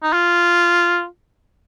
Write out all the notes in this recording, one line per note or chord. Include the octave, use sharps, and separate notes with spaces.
D#4
F4